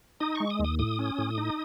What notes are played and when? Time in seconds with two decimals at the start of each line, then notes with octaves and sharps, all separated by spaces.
0.20 D#4 D#6
0.35 C#6
0.40 G#3
0.50 D#6
0.59 D#2
0.64 D#6
0.79 A2 D#6
0.99 C#4
1.18 A2
1.38 D#4